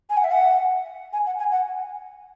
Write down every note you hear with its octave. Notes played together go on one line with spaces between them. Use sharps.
G#5
F#5
E5
F#5
G#5
F#5
G#5
F#5